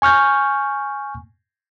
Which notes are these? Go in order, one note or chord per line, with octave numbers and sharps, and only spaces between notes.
G#5 C#6 F6 G6